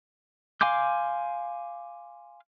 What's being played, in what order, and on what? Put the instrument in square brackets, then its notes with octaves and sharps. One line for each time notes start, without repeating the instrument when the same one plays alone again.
[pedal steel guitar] F5 G#5 C6 D6 G6